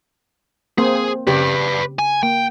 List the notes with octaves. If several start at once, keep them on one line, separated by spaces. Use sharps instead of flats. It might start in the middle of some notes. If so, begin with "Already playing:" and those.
A#3 C4 G#4 C5
C#3 G4 B4 D5
G#5
A#3 G5